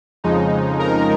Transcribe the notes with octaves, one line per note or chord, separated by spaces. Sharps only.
F2 C#3 F3 G#3 D#4
A#4 A#5